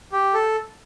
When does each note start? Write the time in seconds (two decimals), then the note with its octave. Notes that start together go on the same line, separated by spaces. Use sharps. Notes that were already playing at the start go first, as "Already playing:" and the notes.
0.12 G4
0.34 A4